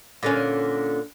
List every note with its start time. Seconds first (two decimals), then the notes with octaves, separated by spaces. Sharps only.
0.23 A#2 D3 C#4